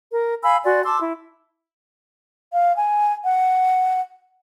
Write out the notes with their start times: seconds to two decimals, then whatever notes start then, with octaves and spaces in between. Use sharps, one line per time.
0.11 A#4
0.43 F5 G#5 B5 E6
0.64 F#4 D5 G#5 C6
0.84 A5 C6 D6 E6
1.00 E4
2.53 F5
2.77 G#5
3.24 F#5